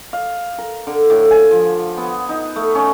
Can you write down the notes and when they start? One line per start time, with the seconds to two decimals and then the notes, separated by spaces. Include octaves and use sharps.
0.13 F5
0.58 A#4
0.87 D3
1.10 A2
1.31 G#5
1.51 F3
1.97 B3
2.29 D#4
2.56 A3
2.75 C#4